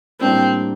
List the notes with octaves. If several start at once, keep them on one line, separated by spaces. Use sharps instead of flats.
A2 G3 A#3 C4 D4